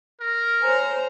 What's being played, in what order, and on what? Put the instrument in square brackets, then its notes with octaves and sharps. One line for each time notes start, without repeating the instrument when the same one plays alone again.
[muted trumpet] A#4
[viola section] C5 [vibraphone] C#5 G#5 [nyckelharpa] A#5